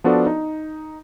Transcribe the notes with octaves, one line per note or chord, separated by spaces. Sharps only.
F3 B3 D4 F#4 A4 D5
D#4